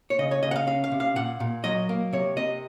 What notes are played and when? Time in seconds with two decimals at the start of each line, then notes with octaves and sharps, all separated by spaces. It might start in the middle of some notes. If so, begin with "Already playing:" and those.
0.10 C#5
0.19 C#3 D#5
0.31 C#5
0.43 C#3 D#5
0.51 F#5
0.56 F5
0.67 C#4 F5
0.84 F5
0.92 C3
1.00 F5
1.16 A#2 F#5
1.40 A#2
1.64 F#3 D#5
1.89 A#3
2.13 C3 C#5
2.37 C3 D#5